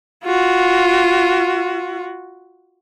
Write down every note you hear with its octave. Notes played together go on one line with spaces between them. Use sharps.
F4 F#4